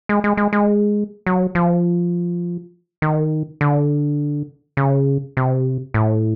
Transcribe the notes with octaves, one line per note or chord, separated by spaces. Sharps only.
G#3
G#3
G#3
G#3
F#3
F3
D#3
D3
C#3
C3
A2